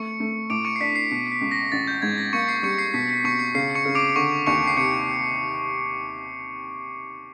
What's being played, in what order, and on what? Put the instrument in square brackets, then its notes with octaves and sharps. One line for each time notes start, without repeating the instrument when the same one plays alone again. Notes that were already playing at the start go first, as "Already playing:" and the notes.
Already playing: [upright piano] A3 [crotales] C#6 C#7
[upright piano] A3
[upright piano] A2 [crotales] D6 D7
[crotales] C#6 C#7
C7
[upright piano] D4 [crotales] B6
[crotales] C7
[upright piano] B2 [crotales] C7
[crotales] B6
[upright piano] C#2
[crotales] A#6
[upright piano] A1 [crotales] A6
[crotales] G6
[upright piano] G#2 [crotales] G#6
[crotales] A#6
[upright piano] A#3 [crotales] C#6 C#7
[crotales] C7
[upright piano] G3 [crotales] C#6 C#7
[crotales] C7
[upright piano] B2 [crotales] B6
[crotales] B6
[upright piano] B2 [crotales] C#6 C#7
[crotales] C7
[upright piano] C#3 [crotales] C7
[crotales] C#6 C#7
[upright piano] C#3
[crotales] D6 D7
[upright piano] D3 [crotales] C#6 C#7
[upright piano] D#2 [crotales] C#6 C#7
[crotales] C7
[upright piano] C3 [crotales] C#6 C#7